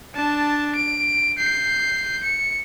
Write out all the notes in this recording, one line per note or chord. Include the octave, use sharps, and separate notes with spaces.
D4 A5
D7
G6 C7
C#7